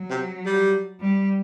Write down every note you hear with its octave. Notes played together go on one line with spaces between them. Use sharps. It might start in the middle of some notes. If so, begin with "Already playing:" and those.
Already playing: F#3
C3
G3
G3